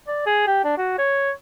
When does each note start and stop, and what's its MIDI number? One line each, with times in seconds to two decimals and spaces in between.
0.07 0.25 74
0.26 0.42 68
0.47 0.64 67
0.64 0.75 62
0.78 0.95 66
0.98 1.31 73